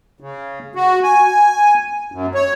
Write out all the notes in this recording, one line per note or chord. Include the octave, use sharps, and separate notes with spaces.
C#3
F#4
G#5
F#2
C#5